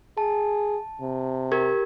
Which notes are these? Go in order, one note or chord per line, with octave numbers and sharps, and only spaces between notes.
G#4 A5
C3
G4 A#4 G#6